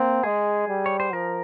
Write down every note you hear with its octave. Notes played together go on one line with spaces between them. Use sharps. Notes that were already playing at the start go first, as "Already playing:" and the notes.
Already playing: A#3 C4
G#3 G#4
G3
C#5
C5
F3 A#4